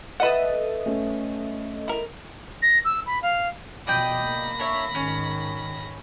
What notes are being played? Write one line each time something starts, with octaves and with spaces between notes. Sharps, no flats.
A4 B4 D#5 E5 F#5
A3 C#4
E4 A#4
A#6
E6
B5
F5
B2 F3 D5 D#5 G5 B5 A#6
A#3
D4 C#5 E5
G#2 D#3 C#4